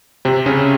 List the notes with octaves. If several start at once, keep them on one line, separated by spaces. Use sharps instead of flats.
C3 C4
C#3 C#4